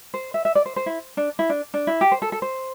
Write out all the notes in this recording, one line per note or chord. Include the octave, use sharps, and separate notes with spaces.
C5
E5
E5
D5
C5
C5
E4
D4
E4
D4
D4
E4
G4
C5
A4
A4
C5